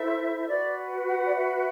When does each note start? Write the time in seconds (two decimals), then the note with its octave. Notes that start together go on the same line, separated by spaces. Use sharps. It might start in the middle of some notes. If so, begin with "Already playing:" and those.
Already playing: E4 A4 C5 E5
0.40 E5
0.47 F#4 B4 D5
1.06 F#5
1.26 D5
1.35 E5